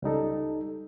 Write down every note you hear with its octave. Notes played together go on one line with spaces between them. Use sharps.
C#2 G3 D#4 A4